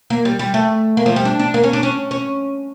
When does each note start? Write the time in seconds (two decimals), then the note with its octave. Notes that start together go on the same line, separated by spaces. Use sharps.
0.10 A#3
0.25 G3
0.39 G3
0.54 A3
0.97 A#3
1.06 F3
1.16 G3
1.25 D4
1.39 D4
1.54 A#3
1.64 C#4
1.73 D4
1.83 C#4
2.11 C#4